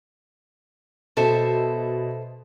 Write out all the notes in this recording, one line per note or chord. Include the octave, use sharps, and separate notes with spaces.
B2 A4 C5 E5